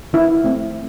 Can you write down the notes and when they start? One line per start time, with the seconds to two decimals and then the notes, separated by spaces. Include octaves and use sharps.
0.13 D#3 E4
0.44 A3 C4